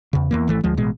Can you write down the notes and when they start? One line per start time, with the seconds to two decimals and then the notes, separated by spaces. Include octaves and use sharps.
0.13 E2 C#3
0.31 E2 E3 A#3
0.48 G#1 E3 A3
0.64 D2 F3 G#3
0.78 A1 B2 G#3